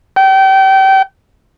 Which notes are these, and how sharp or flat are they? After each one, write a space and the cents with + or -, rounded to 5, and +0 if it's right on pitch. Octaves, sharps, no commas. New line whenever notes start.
G5 -30